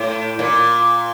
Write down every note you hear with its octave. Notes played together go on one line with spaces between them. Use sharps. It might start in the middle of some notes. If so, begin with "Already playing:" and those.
Already playing: A2
A#2